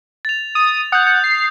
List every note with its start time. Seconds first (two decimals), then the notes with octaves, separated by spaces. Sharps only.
0.25 A6 F7
0.55 D#6
0.92 F#5 D#6 G6
1.07 G6
1.24 C7